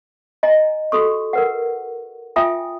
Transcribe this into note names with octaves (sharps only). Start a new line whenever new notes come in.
D#5 G#5 A#5
F#4 G4 A4 C#6
A#4 B4 F#5
F4 E5 G5 G#5 D#6